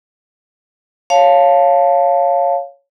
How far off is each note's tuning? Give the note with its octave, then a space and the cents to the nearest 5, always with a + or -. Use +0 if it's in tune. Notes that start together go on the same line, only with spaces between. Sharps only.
C#5 +0 F5 +0 A5 +0